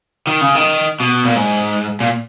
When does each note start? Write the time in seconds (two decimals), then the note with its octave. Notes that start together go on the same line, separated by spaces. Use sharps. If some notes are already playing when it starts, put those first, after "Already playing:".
0.27 D#3
0.41 C#3
0.55 D#3
1.00 B2
1.25 A#2
1.36 G#2
2.00 A#2